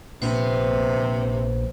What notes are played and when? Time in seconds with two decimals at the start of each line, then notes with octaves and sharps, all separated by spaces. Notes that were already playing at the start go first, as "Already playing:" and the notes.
0.22 A#1 C3 B3 C5